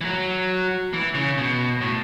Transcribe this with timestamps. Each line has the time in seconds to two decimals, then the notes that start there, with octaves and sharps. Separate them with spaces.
0.01 E3
0.05 F#3
0.93 E3
1.15 C#3
1.38 B2
1.81 A2